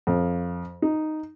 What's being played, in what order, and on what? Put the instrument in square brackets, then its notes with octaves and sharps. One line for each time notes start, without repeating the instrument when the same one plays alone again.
[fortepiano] F2
D#4